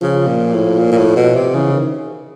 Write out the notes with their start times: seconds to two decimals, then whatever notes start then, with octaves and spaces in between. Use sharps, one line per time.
0.02 C#3 F3
0.27 A#2
0.53 A2
0.78 A#2
0.92 A#2
0.97 A2
1.16 B2
1.35 C3
1.54 C#3 E3
1.72 D#3